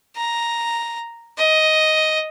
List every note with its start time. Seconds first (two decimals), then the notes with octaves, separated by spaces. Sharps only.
0.17 A#5
1.38 D#5